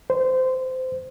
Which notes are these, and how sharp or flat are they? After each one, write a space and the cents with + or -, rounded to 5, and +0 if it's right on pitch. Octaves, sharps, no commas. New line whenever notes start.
C5 -20